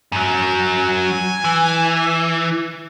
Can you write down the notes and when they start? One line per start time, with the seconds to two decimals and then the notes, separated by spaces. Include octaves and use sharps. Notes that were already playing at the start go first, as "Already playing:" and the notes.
0.12 F#2 F#3
0.80 G#5
1.44 E3